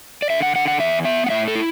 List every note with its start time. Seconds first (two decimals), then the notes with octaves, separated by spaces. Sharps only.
0.22 D5
0.30 D3 E5
0.42 F#5
0.55 D3 F#5
0.68 F#5
0.80 E2 E5
1.05 B3 E5
1.26 F#5
1.30 A2 E5
1.48 A4
1.55 E4